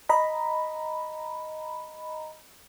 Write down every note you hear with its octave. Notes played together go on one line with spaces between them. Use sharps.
D#5 A#5 B5